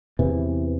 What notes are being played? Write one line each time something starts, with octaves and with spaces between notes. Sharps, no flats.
E2 C3 E3